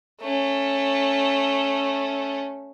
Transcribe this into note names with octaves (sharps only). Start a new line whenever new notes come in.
A3 C#4